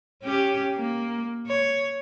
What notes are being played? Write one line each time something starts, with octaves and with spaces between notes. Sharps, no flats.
C#4 G4
A#3
C#5